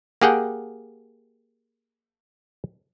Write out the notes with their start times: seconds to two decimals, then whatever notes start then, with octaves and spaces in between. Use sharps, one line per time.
0.22 A#3 G4 G#4 F#5 G5